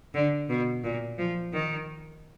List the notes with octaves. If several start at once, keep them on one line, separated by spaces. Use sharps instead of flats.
D3
B2
A#2
F3
D#3